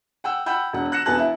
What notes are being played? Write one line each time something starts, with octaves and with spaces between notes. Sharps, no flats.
F#5 G5 E6
F#5 G5 B5 E6 G6
E1 F#5
F#6 A#6 C#7 E7
E1 B3 G#5 A5 F#6
E4 E5